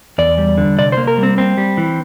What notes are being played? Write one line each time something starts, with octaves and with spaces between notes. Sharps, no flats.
E2 D5
G3
D3
C3 D5
A#3 C5
A#4
G3
C4
A#3 C4
G3
E3